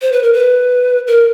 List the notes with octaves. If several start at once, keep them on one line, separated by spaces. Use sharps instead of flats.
C5
B4
A#4
B4
A#4